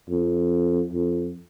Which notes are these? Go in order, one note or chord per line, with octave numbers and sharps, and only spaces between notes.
F2
F2